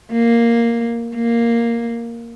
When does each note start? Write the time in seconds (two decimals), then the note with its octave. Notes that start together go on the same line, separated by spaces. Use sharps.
0.12 A#3
1.15 A#3